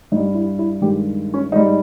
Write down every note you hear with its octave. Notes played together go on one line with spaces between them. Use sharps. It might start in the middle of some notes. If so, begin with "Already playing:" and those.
G2 G3 D#4
E4
E4
G2 D#3 G#3 G4
C#4
G#2 G3 D#4
D#4